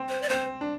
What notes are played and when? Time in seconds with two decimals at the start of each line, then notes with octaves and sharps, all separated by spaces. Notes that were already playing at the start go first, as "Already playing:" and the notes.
Already playing: C4
0.09 C5
0.22 D5
0.29 C4 C5
0.61 D4